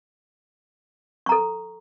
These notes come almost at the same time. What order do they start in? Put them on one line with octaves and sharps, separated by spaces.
C#6 A#5 A4